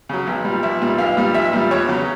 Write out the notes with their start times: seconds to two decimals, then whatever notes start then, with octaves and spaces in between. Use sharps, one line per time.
0.09 C#3 F#3
0.27 B1
0.45 A#2 G3
0.63 B1 E5
0.81 A#2 G3
0.98 B1 F5
1.17 A#2 G3
1.35 B1 E5
1.53 A#2 G3
1.71 E2 C#5
1.88 C#3 F#3